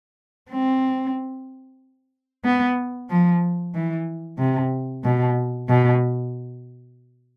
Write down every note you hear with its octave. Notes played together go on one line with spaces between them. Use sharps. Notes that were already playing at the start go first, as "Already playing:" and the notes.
C4
B3
F3
E3
C3
B2
B2